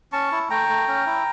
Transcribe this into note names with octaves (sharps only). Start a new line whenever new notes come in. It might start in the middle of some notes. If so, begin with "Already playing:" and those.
C#4 A5 C#6
E4
A3 G5 A#5
A3
C#4
E4